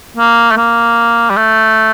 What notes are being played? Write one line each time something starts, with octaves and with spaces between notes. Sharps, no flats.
A#3
A3
A#3
G3
A3